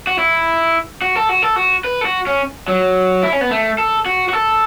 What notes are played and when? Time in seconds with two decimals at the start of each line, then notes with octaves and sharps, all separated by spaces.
0.07 F#4
0.19 E4
1.02 F#4
1.16 A4
1.29 F#4
1.42 A4
1.56 F#4
1.84 B4
2.01 A4
2.05 F#4
2.27 C#4
2.68 F#3
3.23 E4
3.33 C#4
3.41 B3
3.51 A3
3.78 A4
4.06 F#4
4.29 F#4
4.33 A4